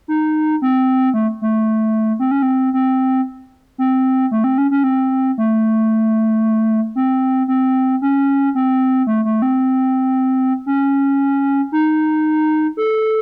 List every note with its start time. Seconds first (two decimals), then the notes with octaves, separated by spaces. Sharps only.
0.08 D#4
0.62 C4
1.14 A3
1.42 A3
2.19 C4
2.31 C#4
2.42 C4
2.74 C4
3.78 C4
4.31 A3
4.44 C4
4.58 C#4
4.71 C#4
4.84 C4
5.38 A3
6.95 C4
7.48 C4
8.02 C#4
8.55 C4
9.07 A3
9.25 A3
9.42 C4
10.66 C#4
11.72 D#4
12.77 A4